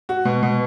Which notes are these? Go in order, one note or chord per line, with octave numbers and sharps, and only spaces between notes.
F#4
B2
B2